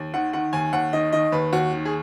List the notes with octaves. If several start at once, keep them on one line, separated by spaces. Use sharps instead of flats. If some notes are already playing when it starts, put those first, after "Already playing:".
Already playing: D#2
D#3 F#5
D#3 F#5
D#2 G#5
D#2 F#5
D#3 D#5
D#3 D#5
D#2 B4
D#2 F#4
D#3
G#4